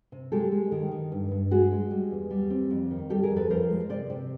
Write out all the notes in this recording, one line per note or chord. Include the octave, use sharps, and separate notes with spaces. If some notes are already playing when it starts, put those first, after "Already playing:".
C3
G#3 G4 A4
G#3
D#3
D#3
G2
G2
G#3 F#4 G#4
G#3
G3
E2
G3
C4
F2
D#3
G3 G4 A4
G#4 A#4
F2
A4 B4
F3 A#4 C5
G#3
C3 C5 D5
C3